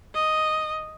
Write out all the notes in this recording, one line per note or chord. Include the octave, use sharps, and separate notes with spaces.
D#5